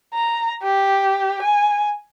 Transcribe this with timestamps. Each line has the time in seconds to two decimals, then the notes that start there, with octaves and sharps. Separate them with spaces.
0.14 A#5
0.63 G4
1.42 G#5